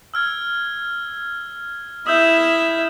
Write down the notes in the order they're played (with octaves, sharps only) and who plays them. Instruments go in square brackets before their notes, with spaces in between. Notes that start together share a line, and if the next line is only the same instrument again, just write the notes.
[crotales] E6 F6 G#6
[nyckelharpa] E4 E5 [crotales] D#6 E6 G6